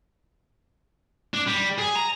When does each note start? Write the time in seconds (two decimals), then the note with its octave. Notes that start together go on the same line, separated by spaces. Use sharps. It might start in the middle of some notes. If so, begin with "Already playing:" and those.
1.34 D4
1.47 G3
1.78 G#4
1.95 A#5